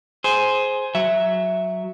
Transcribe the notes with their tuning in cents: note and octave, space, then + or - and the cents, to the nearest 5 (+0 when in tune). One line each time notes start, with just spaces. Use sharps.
G#4 +10 C5 +0
F#3 +0 E5 +0